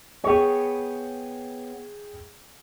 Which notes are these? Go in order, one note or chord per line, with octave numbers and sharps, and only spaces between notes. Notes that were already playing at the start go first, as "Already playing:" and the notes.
B3 G#4 C#5 G5